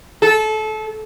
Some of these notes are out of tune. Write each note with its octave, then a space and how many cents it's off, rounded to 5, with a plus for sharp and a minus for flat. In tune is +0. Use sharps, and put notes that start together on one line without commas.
A4 -25